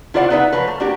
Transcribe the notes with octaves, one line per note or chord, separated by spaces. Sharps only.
E4 F4 C5 D5 F5 F#5
B3 D#4 B4 E5 F#5
F3 F#3 B4
A3
A#3 D4 F#4 G4